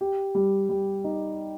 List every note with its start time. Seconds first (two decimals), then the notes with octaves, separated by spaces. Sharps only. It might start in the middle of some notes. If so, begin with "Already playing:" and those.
0.01 G4
0.35 G3
0.69 G3
1.04 D#4